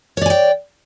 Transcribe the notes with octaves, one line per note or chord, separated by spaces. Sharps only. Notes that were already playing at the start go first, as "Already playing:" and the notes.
C#5 D5 G5 G#5